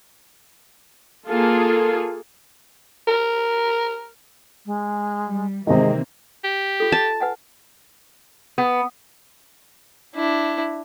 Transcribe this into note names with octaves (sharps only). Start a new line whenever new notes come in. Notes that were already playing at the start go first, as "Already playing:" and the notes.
A#3 F4 G#4 A4
A#4
G#3
G3
C3 D#3 E3 G#3 A#3 C4 D#5
G4
F4 A4
A5
B4 F#5 G#5
B3
D4 E4